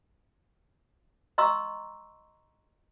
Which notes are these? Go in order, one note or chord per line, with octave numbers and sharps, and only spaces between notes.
D#5 A#5 C6 C#6 E6